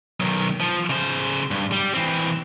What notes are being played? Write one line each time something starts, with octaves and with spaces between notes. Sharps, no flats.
B1 D#3
F3
C#3 C5
G2
G3
E3 C4